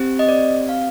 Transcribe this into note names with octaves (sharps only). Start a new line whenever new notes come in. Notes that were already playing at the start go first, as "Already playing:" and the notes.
Already playing: C4 G4
D#5
D5
F5